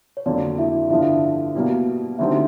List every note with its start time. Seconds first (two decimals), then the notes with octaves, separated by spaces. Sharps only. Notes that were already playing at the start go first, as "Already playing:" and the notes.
0.17 C#5
0.26 F2 D3 F#3 A#3 D4 D5
0.58 E4 E5
0.90 G2 D3 F3 E4 E5
1.55 B2 G3 A#3
2.18 D2 D3 G3 C4 D#4 E4 E5